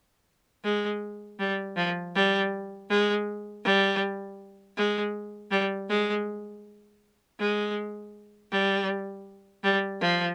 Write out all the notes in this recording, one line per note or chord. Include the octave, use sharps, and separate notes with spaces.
G#3
G3
F3
G3
G#3
G3
G#3
G3
G#3
G#3
G3
G3
F3